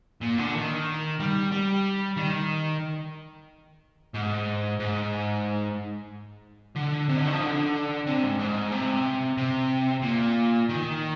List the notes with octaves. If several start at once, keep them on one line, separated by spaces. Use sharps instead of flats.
A#2
D3
D#3
G3
G3
D#3
G#2
G#2
D3
C3
D3
D#3
F3
D3
C3
G#2
G#2
C3
C3
A#2
D#3